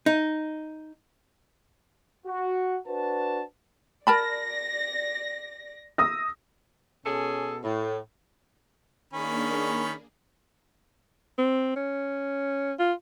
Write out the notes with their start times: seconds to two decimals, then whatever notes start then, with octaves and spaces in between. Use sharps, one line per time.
0.06 D#4
2.26 F#4
2.87 D4 F#4 B4 C5 A5
4.07 A#4 D5 A5 B5 A#6
5.98 D#6 E6 A#6
7.06 B2 C#4 G#4 A4
7.64 A2
9.13 D#3 A#3 C#4 D4 G#4 B5
11.38 C4
11.76 C#4
12.79 F4